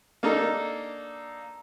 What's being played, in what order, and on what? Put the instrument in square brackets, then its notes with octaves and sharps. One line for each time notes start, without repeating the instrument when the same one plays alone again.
[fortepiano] A#3 D4 D#4 A4